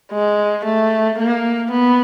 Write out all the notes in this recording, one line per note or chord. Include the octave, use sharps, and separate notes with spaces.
G#3
A3
A#3
B3